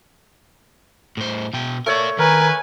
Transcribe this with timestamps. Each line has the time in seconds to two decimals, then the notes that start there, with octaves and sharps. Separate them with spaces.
1.17 A2 C5
1.53 B2 G5
1.86 A3 A#4 C#5 D5
2.19 D#3 A#4 B4 G#5